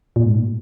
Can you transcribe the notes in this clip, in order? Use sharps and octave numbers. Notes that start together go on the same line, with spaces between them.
A#2
G#2
A#2